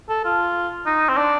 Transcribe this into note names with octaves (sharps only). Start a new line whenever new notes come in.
A4
F4
D#4
C4
D4